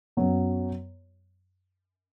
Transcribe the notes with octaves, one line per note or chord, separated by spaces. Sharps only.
F#2 F#3 B3 F#4